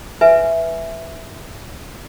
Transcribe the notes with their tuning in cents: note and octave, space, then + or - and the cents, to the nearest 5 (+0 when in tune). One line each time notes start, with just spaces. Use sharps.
B4 +0 E5 +0 G#5 +0